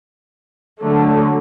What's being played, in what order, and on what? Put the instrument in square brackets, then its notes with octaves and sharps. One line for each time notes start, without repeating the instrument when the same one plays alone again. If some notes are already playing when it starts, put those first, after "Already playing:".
[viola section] D3 F#3 A3